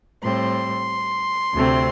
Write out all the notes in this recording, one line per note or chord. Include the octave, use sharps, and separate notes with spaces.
A2 G3 C4 C6
D2 C3 A3 C4